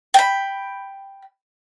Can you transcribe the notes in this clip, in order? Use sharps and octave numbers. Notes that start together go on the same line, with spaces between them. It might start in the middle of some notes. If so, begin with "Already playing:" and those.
G5 B5